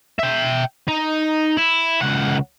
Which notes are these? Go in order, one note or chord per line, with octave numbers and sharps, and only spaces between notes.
E5 G5
D#4
E4
C#2 F#5